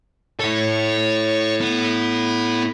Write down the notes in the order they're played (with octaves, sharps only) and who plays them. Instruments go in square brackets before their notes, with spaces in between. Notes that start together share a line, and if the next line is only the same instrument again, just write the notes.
[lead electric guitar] E4 A4 [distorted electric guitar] C#5
[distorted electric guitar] B3